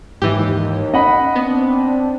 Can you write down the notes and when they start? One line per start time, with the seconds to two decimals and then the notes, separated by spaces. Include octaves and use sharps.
0.22 D#2 G#2 E3 G4
0.94 C#4 D#5 F#5 B5
1.36 B3 C4 D4